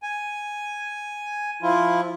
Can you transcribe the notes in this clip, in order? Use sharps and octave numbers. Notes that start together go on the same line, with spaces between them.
G#5
F3 E4 F4